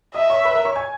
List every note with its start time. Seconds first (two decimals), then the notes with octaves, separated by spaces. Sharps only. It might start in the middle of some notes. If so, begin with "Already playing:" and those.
0.14 D#5 E5 D#6
0.30 C#5 C#6
0.45 B4 B5
0.55 A#4 A#5
0.65 C#5 C#6
0.76 G#5 G#6